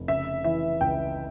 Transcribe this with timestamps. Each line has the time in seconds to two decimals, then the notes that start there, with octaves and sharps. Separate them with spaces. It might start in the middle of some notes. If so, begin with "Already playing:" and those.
Already playing: F1
0.08 C#3 E5
0.44 E3 E5
0.81 C#2 G5